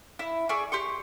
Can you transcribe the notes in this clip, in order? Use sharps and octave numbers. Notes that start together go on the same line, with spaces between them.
E4
G#4 D5 E5 C#6
G4 C6 C#6